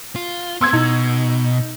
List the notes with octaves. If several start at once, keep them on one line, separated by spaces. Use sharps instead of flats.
F4
B3 C4 C6 E6 G#6
B2 D#4